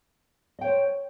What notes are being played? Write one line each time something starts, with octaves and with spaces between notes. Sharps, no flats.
C5 C#5 D#5 G5